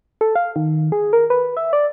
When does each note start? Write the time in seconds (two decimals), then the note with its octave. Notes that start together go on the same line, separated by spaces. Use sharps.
0.21 A4
0.35 F5
0.56 D#3
0.92 G#4
1.13 A#4
1.30 B4
1.57 E5
1.73 D5